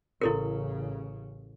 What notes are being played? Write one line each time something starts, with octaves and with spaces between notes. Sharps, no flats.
A1 C#3 E4 A4 A#4